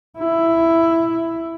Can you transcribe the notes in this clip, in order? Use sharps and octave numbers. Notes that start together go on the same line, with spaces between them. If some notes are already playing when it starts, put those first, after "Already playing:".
E4